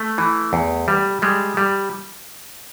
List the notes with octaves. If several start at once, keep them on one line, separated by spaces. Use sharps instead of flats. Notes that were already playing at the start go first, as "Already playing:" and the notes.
Already playing: A3
E3
E2
G3
G3 G#3
G3